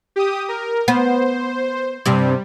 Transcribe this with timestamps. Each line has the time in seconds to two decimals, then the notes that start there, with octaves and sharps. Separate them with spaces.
0.16 G4 D#6
0.49 A#4
0.88 B3 C5
2.06 G2 C3 G3